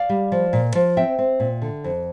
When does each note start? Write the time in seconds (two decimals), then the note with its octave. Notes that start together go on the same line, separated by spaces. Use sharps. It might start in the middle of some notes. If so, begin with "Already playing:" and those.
Already playing: D5 F5
0.09 G3
0.32 F3
0.53 A#2
0.75 F3
0.97 C4 E5 G5
1.19 C4
1.40 A#2
1.62 D3
1.84 F2